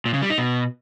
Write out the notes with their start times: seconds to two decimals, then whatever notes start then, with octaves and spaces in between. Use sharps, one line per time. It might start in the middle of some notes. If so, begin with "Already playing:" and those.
0.06 A#2
0.14 C#3
0.22 G3
0.30 D#4
0.38 B2